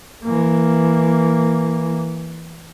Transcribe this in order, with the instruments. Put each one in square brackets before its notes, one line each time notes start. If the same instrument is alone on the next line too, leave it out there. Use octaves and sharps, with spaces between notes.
[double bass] E3 A#3